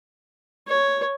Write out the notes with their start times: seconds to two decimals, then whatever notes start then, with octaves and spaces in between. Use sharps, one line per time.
0.68 C#5